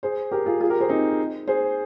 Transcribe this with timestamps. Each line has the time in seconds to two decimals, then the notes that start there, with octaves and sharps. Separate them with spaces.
0.03 G#4 C5
0.31 G4 A#4
0.46 F4 G#4
0.60 F4 G#4
0.70 G4 A#4
0.80 G#4 C5
0.89 C4 D#4
1.48 G#4 C5